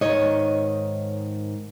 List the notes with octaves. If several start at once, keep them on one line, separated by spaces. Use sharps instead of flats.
G#2 D#3 C#5 D#5